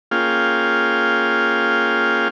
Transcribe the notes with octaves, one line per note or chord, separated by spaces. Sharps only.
A#3 C#4 F4 G#4 F5 G5